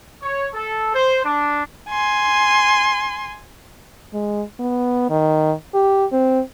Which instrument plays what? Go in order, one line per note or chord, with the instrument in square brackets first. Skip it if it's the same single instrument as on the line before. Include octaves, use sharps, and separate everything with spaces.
[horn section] C#5
A4
C5
D4
[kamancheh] G#5 C6
[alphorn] G#3
B3
D#3
G4
C4